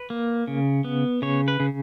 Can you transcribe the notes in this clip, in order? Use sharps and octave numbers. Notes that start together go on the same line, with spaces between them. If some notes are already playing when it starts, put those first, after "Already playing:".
Already playing: B4
A#3
C#3
B3
C#3 C#5
B4
C#3